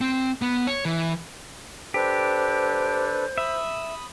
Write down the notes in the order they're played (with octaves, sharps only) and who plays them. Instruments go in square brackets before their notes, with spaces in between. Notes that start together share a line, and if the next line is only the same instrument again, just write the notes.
[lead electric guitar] C4
B3
C#5
E3
[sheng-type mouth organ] D4 A4 B4 [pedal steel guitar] G4 [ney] C5
[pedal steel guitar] E5 [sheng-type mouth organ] B5 D#6